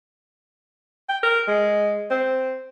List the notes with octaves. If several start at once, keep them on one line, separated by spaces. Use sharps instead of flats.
G5
A#4
G#3
C4